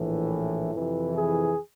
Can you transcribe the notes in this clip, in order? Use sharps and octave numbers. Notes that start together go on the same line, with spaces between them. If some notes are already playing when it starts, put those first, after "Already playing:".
Already playing: A#1 A2 E3
F2 C3 E3
G#4